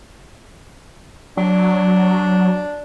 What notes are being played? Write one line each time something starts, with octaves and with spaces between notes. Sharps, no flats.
F#3 D4